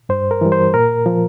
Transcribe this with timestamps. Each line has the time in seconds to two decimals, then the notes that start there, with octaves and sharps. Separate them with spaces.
0.09 G2 C5
0.31 A#4
0.41 E3 G3
0.52 C5
0.74 A#2 A#4
1.06 F3